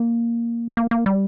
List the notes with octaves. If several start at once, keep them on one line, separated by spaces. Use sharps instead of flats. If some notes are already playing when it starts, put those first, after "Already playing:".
Already playing: A#3
A#3
A#3
G3